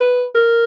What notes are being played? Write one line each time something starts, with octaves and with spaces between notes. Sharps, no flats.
B4
A#4